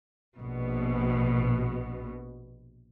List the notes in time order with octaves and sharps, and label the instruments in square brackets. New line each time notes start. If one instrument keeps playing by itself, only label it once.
[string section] A#1 B2